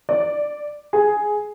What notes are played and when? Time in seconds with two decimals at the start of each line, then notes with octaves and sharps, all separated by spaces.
0.09 D5
0.93 G#4